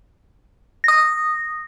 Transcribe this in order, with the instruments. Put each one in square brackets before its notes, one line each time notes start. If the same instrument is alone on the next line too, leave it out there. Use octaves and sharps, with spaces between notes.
[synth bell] D#6 A#6